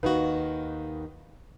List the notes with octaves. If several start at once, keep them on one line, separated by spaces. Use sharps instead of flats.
D#2 D#3 D#4 F#4 B4 F5